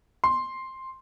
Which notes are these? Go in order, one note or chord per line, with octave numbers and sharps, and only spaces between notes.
C6